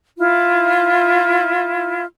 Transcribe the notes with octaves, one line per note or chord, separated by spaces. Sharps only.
E4 F4